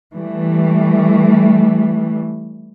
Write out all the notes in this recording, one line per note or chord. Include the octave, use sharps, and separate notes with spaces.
E3 G3 A3